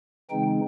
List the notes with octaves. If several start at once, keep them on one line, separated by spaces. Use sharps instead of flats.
C#3 E3 G#3 C4 D#4 G5